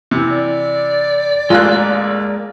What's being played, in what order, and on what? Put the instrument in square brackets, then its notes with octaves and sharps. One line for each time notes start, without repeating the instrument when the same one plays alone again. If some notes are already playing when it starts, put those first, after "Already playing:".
[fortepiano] C3 E3
[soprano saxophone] D5
[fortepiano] A1 D2 F#6 [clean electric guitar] G#3 A#3 [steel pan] F4